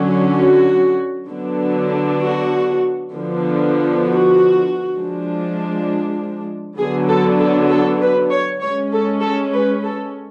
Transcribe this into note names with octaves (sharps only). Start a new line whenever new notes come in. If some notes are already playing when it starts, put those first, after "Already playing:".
Already playing: D3 F#3 C#4
F#4
D3 F#3 B3 D4
F#4
D3 F3 B3
F#4
F3 G#3 D4
D3 F#3 B3 D4 G#4
A4
A4
A4
B4
C#5
G#3 C#4 C#5
A4
A4
B4
A4